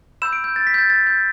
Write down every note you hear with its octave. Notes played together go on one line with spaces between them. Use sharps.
B5 E6 G6 E7
D7
G6
A6
B6
G6
A6
A6
G6